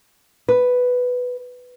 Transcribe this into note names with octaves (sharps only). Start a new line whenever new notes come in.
B4